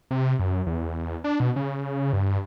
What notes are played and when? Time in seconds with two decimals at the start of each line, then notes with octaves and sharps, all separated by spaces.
0.11 C3
0.39 F#2
0.67 E2
1.24 D4
1.40 B2
1.56 C#3
2.13 G2